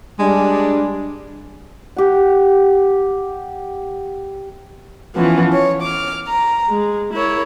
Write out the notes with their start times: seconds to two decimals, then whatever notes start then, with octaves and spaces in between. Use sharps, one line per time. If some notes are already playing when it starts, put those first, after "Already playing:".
0.19 G3 G#3 D4
1.96 G4 F#5
5.15 E3 F3 B3 C#4
5.53 C#5
5.82 D6 F6
6.27 A#5
6.68 G#3
7.13 E4 A#4 C#5